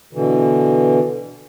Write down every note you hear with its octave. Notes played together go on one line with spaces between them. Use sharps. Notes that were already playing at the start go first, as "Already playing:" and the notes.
B2 D3 E3